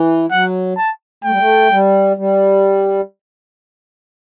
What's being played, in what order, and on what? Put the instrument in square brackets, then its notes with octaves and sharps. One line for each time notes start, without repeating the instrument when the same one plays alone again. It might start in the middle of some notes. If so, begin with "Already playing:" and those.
Already playing: [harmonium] E3
[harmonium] F#3 [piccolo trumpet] F#5
[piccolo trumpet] A5
[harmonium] A3 [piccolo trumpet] G5
[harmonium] G3
A3
G3
G3